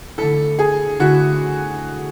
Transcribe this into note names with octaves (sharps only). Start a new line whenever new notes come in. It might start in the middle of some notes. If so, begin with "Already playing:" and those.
D3 A3 E4 A4
G#4
D3 A3 E4 F#4